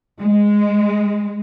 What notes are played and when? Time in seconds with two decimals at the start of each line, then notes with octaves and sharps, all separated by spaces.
0.20 G#3